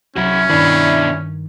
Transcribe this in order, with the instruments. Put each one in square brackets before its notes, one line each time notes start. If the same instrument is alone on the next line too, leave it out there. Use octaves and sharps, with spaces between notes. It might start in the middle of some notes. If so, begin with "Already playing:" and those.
[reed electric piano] C2 C3 F#3 [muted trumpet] C#4 [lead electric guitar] E4 F#4
[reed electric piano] G2 D#3 [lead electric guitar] B2 D4 [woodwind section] E4 B5